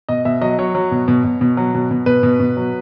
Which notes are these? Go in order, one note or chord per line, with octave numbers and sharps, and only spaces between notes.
B2 D#5
B2 E5
F#3 D#5
F#3 C#5
F#3
B2
B2
B2
B2
F#3
B2
B2
B2 B4
B2
B2
F#3